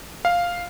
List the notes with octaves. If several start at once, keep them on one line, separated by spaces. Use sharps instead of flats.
F5